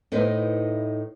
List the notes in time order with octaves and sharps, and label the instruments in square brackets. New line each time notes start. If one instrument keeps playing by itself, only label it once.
[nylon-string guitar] A2 D#4 E4 B4 C5